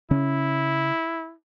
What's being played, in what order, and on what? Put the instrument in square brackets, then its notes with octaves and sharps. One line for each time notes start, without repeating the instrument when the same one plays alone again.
[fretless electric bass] C#3 C#4 [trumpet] E4